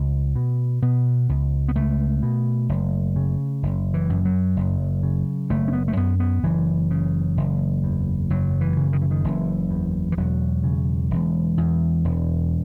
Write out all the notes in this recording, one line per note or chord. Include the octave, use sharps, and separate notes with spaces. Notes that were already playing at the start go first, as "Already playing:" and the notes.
Already playing: C#2 A3
B2
B2 B3
C#2
B3
C#2 A3
B2
F#1
C#3
F#1
E3
F#2
F#3
F#1
C#3
F#1 A3
C#4
B3
A3
F#2 B3
B3
F#1 E3
C#3
F#1
E2
F#1 F#3
E3
C#3
D#3
E3
D#3
F#1 E3
E2
E3
E1 F#3
C#3
E1
E2
E1